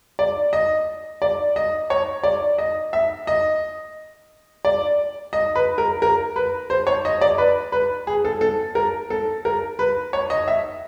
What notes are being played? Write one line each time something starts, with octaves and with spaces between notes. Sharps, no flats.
D5
D#5
D5
D#5
C#5
D5
D#5
E5
D#5
D5
D#5
B4
A#4
A#4
B4
C5
C#5
D#5
D5
B4
B4
G#4
A4
A4
A#4
A4
A#4
B4
C#5
D#5
E5